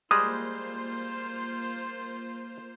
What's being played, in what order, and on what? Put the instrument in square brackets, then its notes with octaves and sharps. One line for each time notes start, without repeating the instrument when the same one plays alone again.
[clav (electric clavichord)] G3 G#3 [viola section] A#3 F4 C5 [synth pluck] D#6